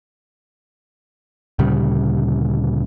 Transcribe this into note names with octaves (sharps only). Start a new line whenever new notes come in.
D2 A#2 C#3 G3